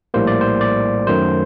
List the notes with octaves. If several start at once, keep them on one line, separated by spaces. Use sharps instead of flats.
A#1 A2 G3 A#3 C5
D5
C5
D5
F#2 D#3 F#3 A3 C5